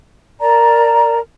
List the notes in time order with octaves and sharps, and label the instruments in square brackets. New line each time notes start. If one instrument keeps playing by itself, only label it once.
[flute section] A#4 D5 A5 A#5